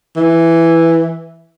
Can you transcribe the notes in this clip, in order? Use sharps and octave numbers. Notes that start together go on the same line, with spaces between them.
E3